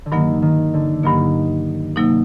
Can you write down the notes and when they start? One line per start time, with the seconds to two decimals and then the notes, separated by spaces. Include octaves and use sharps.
0.06 D3
0.12 G2 D#3 F#3 A#3
0.42 D#3
0.74 D3
1.03 G2 D#3 F#3 A#3
1.96 C3 F#3 A#3 D#4